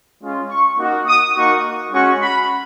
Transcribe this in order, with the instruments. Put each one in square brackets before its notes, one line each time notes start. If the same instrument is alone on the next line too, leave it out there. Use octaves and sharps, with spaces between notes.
[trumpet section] G#3 C#4 F4
C#6
A#3 D#4 F#4
D#6
A#3 D#4 F#4 C#6
G#3 C#4 F#4 C#6
B5